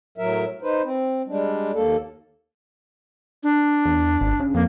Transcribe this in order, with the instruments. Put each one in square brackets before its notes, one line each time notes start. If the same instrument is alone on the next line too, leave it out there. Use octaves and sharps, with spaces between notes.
[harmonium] A2 F#3 A#4 E5
D#4 B4 C5
C4
G3 G#3 D4
D#2 A#3 A4
[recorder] D4
[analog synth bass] E2
G#1
C#3
[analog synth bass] F2 [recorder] A#3